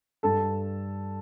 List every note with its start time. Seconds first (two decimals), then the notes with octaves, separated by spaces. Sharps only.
0.23 G2 A4 A5